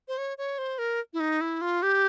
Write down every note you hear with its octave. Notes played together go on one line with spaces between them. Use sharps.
C5
C#5
C#5
C5
A#4
E4
D#4
E4
F4
G4